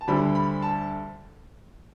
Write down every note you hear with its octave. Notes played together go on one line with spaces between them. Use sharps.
A5
D2 D3 G3 C4 B5
B5
A5